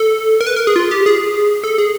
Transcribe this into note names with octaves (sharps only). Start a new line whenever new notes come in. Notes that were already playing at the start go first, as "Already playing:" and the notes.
Already playing: A4
A#4
B4
A#4
G#4
F4
G4
G#4
A4
G#4